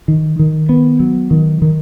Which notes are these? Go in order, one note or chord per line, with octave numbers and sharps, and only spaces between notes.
D#3
D#3
B3
F#3
D#3
D#3